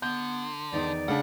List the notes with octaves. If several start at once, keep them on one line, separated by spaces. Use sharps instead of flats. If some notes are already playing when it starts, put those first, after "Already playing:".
D3 B3 G6
E2 D#3 D#4 D5
C#3 A3 D4 F#5